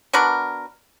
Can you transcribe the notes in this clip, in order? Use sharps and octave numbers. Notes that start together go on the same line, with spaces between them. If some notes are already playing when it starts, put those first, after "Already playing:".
B3 D4 F#4 A#4